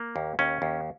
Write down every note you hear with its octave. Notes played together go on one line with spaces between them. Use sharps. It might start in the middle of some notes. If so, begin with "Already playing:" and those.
Already playing: A#3
D#2
D#2 C#4
D#2